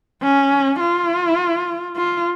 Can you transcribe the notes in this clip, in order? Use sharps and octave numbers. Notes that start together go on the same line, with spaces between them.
C#4
F4
F4